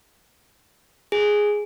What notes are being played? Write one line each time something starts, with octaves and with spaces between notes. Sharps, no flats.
G#4